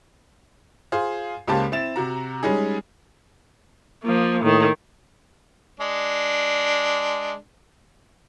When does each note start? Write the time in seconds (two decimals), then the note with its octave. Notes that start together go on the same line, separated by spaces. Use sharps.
0.92 F4 G#4 C5 F5
1.48 C#2 C#3 A#3 G4 C5 A5
1.72 C4 E4 A6 E7
1.96 C3 F#4 A#5
2.43 G3 G#3 C#4 D#4 G#4
4.03 F3 A#3
4.44 A2 D#3
5.80 G#3 D4